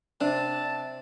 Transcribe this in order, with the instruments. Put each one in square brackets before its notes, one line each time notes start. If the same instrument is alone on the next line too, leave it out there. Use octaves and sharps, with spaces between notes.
[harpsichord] C3 [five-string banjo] D4 [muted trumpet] A5